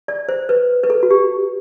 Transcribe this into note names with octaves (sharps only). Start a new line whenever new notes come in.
D5
C5
B4
B4
A4
F#4
G4